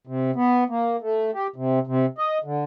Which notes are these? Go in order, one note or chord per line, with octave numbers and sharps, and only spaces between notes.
C3
B3
A#3
A3
G4
C3
C3
D#5
D3